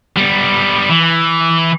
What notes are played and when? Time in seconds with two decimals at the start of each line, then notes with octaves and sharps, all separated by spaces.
0.16 G3 B3
0.90 E3